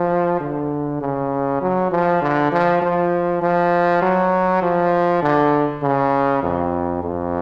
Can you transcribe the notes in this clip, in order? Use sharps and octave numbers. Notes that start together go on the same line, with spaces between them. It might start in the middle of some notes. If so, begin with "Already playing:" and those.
Already playing: F3
D3
C#3
F#3
F3
D3
F3
F3
F3
F#3
F3
D3
C#3
F2
F2